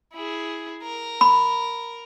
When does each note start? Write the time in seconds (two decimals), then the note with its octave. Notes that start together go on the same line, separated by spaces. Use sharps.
0.13 E4 G#4
0.83 A#4
1.21 B5